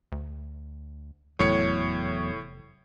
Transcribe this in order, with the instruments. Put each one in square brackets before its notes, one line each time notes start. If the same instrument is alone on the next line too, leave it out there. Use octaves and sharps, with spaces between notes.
[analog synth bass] D2
[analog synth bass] F1 [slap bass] E2 F#3 [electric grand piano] A2 C#5 C#7